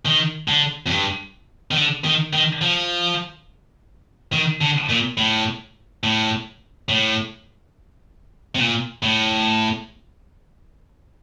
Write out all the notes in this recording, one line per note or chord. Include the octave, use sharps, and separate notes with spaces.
D#3
D3
F2
G2
D#3
D3
D#3
D#3
F3
D#3
D3
A#2
A2
A2
A2
C3
A#2
A2